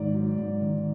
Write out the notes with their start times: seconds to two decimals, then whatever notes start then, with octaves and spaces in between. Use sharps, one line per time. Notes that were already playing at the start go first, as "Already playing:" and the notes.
Already playing: G#2 D#3 D5
0.14 F#3
0.38 G#2
0.61 D#3